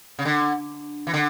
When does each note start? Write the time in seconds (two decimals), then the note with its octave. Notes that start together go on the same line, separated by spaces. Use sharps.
0.19 C#3
0.25 D3
1.07 E3
1.14 D3